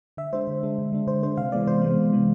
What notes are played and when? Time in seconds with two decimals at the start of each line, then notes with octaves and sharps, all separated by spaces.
0.17 D3 E5
0.33 G#3 D4 C5
0.47 D3
0.63 G#3 D4
0.78 D3
0.92 G#3 D4
1.07 D3 C5
1.23 G#3 D4 C5
1.37 C3 F5
1.52 E3 G#3 B3 D5
1.67 C3 C5
1.82 E3 G#3 B3
1.97 C3
2.12 E3 G#3 B3